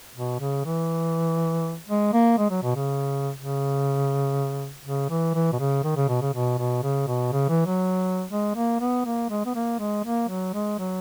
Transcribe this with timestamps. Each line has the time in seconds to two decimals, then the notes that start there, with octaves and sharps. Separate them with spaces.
0.15 B2
0.40 C#3
0.65 E3
1.89 G#3
2.13 A#3
2.38 G#3
2.51 F#3
2.63 B2
2.75 C#3
3.37 C#3
4.85 C#3
5.10 E3
5.35 E3
5.53 B2
5.59 C#3
5.84 D#3
5.96 C#3
6.09 B2
6.21 C#3
6.34 B2
6.58 B2
6.83 C#3
7.07 B2
7.33 C#3
7.49 E3
7.66 F#3
8.31 G#3
8.56 A#3
8.81 B3
9.06 A#3
9.30 G#3
9.46 B3
9.55 A#3
9.80 G#3
10.04 A#3
10.29 F#3
10.54 G#3
10.79 F#3